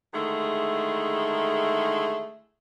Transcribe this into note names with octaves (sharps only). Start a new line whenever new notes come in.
D3 D#3 G#3 A3 E4 G#4